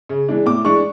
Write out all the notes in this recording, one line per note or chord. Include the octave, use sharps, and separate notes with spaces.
C#3
E3 G#3 D4
A2 D6
E3 G#3 D4 C#6